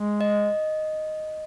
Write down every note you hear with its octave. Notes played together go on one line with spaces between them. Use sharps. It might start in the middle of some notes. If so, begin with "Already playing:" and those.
Already playing: G#3
D#5